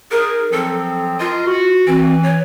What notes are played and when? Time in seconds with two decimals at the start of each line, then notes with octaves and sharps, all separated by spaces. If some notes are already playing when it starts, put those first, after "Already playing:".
0.11 D#4 G#4 A#4
0.52 F3 F#3 C4 A4
1.20 F4 A#4 D#5 C6
1.47 F#4
1.87 E3 C4
2.23 C#5